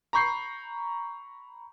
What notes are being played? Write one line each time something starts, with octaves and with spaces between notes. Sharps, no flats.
A#5 B5 C#6 G6 C7